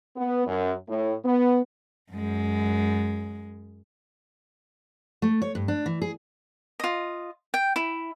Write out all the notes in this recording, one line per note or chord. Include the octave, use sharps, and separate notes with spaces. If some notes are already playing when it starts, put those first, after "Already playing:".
B3
F#2
A2
B3
F#2 G#3
A3
C#5
G2
D4
E3
G#4
F4 D#5
G5
E4